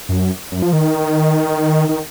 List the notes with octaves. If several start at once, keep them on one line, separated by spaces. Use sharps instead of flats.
F#2
F#2
F3
D#3
D#3